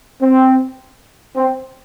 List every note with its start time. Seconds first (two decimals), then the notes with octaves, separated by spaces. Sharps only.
0.22 C4
1.37 C4